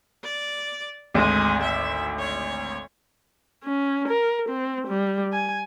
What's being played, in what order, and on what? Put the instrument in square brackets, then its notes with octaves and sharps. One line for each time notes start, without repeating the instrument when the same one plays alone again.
[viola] D5
[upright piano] G#1 D2 [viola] G#3
[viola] E5
C#5
C#4
A#4
C4
G3
G#5